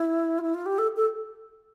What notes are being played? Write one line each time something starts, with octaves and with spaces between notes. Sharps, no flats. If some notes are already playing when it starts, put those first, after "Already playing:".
Already playing: E4
F4
E4
F4
G4
A4
A4